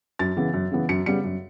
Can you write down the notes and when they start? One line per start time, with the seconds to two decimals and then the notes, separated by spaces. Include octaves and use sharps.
0.19 F#2 A6
0.37 C#3 E3 B3
0.54 F#2
0.72 C#3 E3 B3
0.89 F#2 C#7
1.06 C#3 G3 B3 C#7
1.24 F#2